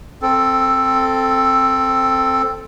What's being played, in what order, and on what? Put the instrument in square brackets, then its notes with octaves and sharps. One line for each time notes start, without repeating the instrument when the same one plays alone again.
[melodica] C4 A4